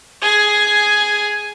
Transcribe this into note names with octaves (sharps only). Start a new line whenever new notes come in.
G#4 G#5